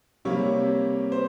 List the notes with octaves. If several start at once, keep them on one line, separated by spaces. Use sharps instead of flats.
C3 G3 A#3 C#5
C5